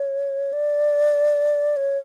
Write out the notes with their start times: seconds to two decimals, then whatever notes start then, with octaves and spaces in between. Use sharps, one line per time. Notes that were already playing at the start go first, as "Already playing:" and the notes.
Already playing: C#5
0.53 D5
1.76 C#5